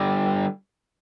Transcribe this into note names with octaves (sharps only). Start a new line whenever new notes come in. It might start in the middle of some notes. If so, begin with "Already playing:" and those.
Already playing: D3 G3